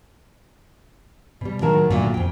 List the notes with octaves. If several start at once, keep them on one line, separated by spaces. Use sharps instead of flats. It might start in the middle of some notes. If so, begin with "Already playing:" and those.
B2 G3
A2 D#3 F#3 G#3 A#4 A5
F#2 A#2 D3 F#3 A3
F2 G5